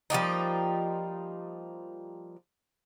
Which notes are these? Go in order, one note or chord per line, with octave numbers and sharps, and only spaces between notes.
F3 G3 A#3 D#4